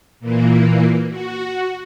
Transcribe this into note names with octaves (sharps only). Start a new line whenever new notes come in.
A#2 E3 A#3
F#4